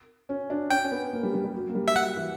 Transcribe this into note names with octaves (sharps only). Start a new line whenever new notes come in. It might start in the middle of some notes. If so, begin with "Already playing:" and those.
C#4
D4
C#4 G5
C#4
B3
A#3
G3
G3
G3
F#3
A#3
G3
E5
F#3 F#5
E3